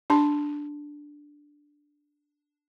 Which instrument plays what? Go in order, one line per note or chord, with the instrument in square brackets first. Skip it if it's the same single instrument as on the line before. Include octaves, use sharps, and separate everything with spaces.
[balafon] D4 A5 C6